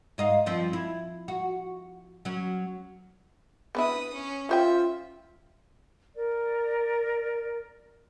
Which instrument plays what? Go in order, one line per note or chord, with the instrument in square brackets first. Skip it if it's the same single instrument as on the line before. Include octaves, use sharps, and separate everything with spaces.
[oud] G#2 D#5 F5
G2 F3 C4
E4
F#4
F#3 C#4
[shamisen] B3 D4 E4 [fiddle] B4 D#6
[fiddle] C#4
[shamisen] C#4 C5 G5 [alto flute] F4 [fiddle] E5
[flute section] A#4 D5